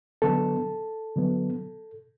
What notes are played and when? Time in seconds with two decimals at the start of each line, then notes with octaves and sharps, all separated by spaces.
0.22 D3 F#3 B3 A4
1.16 D3 F#3 B3